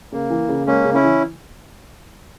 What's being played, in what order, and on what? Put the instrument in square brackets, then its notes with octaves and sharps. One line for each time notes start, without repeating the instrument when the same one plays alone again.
[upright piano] C#3 [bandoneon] A#3
[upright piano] E3
C#3
[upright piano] G#3 [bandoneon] A#3 C#4
[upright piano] C#3
[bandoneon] C#4 E4
[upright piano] E3